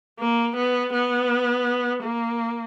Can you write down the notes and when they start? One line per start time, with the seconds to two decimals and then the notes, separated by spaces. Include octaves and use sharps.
0.20 A#3
0.57 B3
0.93 B3
2.03 A#3